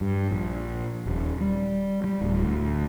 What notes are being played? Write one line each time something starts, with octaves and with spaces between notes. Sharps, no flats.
G2
A#1
D#1
G3
G3
D1
D2